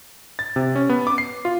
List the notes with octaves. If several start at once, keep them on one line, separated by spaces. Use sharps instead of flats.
A6
C3
C#4
B3
D6
C7
F4